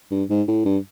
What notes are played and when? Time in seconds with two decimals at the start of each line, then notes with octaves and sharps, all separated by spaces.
0.11 G2
0.30 G#2
0.48 A2
0.65 G2